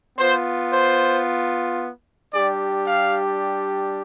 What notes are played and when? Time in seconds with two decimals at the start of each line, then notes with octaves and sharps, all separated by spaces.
0.17 B3 F4 C5
0.71 C5
2.32 G3 D4 G4 D5
2.86 F5